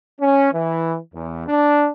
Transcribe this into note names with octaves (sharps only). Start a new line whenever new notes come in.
C#4
E3
E2
D4